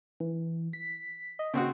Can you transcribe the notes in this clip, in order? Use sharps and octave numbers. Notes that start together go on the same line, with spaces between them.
E3
B6
D#5
D#2 C#3 C4 F#4